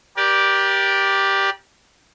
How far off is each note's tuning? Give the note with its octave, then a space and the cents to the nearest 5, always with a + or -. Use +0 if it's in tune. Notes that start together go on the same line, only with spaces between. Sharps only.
G4 +0 A#4 +40 D5 +0